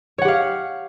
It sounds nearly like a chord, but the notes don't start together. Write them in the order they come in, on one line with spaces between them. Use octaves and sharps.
C#5 F#5 G4 F5